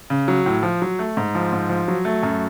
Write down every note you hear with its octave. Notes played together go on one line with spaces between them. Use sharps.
C#3
F#3
A2
F3
F#3
A3
G#2
F3
G#2
F3
F#3
A3
F#2